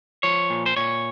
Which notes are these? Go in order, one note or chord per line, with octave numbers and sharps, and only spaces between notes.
F3 C#5
A#2
C5
A#2 C#5